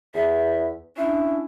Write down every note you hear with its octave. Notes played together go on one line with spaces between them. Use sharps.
E2 E5
C#4 D4 E4